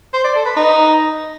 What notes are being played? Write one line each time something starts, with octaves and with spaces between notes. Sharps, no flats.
C5
D5
A4
B4
D#4